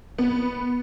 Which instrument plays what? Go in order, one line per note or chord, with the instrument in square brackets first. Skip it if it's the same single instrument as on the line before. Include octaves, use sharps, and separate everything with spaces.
[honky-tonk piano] B3